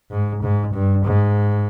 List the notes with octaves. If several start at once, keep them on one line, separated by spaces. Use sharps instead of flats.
G#2
G#2
G2
G#2